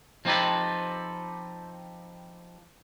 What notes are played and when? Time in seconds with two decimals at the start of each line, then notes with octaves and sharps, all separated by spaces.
0.25 F3 C4 D#4 G4 A4 B4